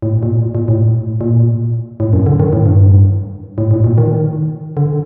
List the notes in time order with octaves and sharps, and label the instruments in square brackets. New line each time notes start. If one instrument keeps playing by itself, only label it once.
[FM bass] A2
A#2
A#2
A2
A#2
A2
F#2
D3
D#3
A2
G2
A2
A2
A#2
D#3
D3